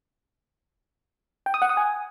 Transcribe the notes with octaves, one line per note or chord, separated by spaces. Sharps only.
G5
D#6
F#5
D#6
G#5